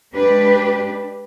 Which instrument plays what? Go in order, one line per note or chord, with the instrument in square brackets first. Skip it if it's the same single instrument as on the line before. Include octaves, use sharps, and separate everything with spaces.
[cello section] G#3 D4 G4 B4